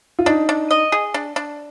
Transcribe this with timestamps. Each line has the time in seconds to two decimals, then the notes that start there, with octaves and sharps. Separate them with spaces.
0.19 F4
0.26 D4 D#4
0.49 D4
0.71 D#5
0.92 G#4
1.14 D4
1.36 D4